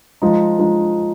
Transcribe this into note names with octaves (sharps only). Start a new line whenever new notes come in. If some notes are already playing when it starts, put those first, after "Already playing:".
F3 G#3 D#4
F3 G#3 D#4